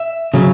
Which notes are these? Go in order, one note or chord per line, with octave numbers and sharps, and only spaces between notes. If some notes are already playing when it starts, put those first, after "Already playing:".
Already playing: E5
C#3 F#3